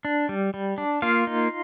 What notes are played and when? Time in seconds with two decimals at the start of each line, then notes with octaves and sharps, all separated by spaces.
0.05 D4
0.29 G3
0.54 G3
0.78 D4
1.02 A#3 F4 F5
1.27 D#4